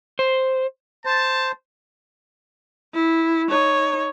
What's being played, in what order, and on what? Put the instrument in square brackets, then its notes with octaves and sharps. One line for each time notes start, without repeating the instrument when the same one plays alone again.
[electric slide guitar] C5
[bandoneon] C5 [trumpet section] A5
[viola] E4
D#4 C#5